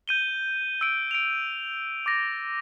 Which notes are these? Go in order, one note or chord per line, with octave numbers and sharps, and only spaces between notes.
G6 D#7 G7
E6 D7
D7 F7
D6 A6 A#6